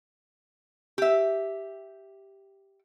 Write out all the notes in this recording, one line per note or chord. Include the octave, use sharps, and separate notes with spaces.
G4 E5